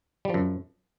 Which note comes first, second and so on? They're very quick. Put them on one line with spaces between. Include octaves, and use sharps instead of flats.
G3 F3 F#2